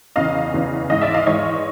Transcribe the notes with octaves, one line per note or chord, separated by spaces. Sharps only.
E2 C#3 E3 D#5 F5
E2 C#3 E3
G#2 E3 D#5 F5
D5 E5
D#5 F5
G#2 E3 C#5 D#5